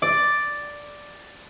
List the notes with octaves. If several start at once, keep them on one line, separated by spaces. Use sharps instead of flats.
D5